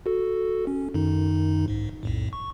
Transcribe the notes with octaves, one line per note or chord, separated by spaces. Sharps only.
F#4 A4
C#4
F#2 D#3 D#4
B1 G#2
B1 F2 A2
C#6